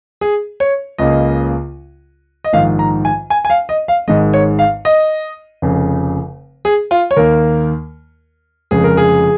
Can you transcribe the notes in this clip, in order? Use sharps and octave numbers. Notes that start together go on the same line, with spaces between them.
G#4
C#5
C#2 C#3 A#3 D#5
D#5
A#1 G#2 D#3 F5
A#5
G#5
G#5
G#5
F5
D#5
F5
G#1 G#2 D#3 G#3 D#5
C#5
F5
D#5
F1 F2 C#3
G#4
F4
C#5
D#2 D#3 A#3 A#4
F1 F2 C#3 G#3 G#4
A#4
G#4